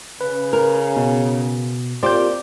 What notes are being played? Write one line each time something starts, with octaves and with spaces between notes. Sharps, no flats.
C#3 B4
A#4
B2
A#3 C4 F4 G4 C5 D5 D6 G6